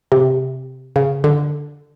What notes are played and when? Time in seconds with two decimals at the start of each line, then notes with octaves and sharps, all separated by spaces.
0.12 C3
0.96 C#3
1.24 D3